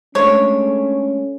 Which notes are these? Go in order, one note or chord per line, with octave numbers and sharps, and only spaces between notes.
G#3 A3 C#4 D4 C#5